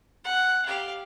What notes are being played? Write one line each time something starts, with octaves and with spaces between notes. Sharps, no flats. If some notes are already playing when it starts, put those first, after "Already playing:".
F#5
G4 F5